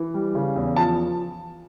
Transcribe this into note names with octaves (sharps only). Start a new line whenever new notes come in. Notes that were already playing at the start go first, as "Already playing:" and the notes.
Already playing: E3
G3
C#3
E2
F3 A5